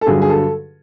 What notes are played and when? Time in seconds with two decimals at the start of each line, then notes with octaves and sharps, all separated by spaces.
0.01 A4
0.06 G2 D3 F#3 G#4
0.22 G#4
0.29 A4